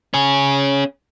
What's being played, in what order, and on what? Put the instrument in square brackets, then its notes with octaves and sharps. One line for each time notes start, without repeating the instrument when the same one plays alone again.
[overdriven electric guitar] C#4 G#4